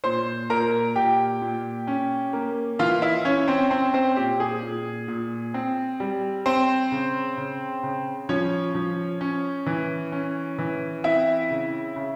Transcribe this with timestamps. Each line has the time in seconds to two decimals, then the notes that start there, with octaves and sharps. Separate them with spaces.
0.04 A#2 C5 C6
0.50 A#2 A#4 A#5
0.96 A#2 G4 G5
1.42 A#2
1.87 C#4
2.33 A#3
2.79 E3 F4 F5
3.02 E4 E5
3.25 C#4 C#5
3.48 C4 C5
3.71 C4 C#4 C5
3.94 C4 C5
4.16 A#2 G4
4.40 G#4
4.63 A#2
5.08 A#2
5.54 C4
6.00 G3
6.46 C4 C5
6.92 C#3
7.37 C#3
7.83 C#3
8.29 F3 C#4 C#5
8.75 F3
9.21 C#4
9.66 E3
10.12 C#4
10.59 E3
11.04 C4 E4 E5
11.50 C#3
11.96 C#3